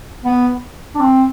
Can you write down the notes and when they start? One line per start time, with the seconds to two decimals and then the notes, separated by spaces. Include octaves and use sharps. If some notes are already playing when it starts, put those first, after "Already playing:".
0.25 B3
0.95 D4
1.00 C4